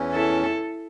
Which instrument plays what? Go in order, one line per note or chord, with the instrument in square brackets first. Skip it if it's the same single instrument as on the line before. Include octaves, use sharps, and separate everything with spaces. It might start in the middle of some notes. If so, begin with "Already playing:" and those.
Already playing: [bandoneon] E2 E3 C#4
[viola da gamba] E4 A4